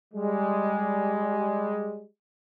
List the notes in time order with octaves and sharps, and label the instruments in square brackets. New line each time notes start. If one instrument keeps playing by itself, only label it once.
[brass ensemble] G3 G#3